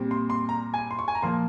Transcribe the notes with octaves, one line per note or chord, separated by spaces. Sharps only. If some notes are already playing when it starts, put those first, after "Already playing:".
Already playing: A#2 G3 C4
C6
C6
A#5
G#5
C6
C#6
G#5
A#5
A#2 F3 A#3 C6